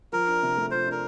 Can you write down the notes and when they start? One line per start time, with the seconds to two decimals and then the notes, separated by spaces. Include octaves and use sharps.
0.13 F3 A#4
0.28 D4
0.43 C3
0.57 A3
0.71 F3 C5
0.87 D4 A#4